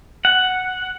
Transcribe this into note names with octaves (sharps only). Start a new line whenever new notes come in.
F#5